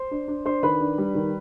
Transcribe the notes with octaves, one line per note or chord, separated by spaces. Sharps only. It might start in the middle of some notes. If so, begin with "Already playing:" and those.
Already playing: C5 C6
D4
D4
D4 C5 C6
D#3 B4 B5
D4
G3
D#3